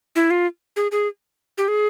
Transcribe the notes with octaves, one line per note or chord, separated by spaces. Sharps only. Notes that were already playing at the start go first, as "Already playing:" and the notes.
E4
F4
G#4
G#4
G4
G#4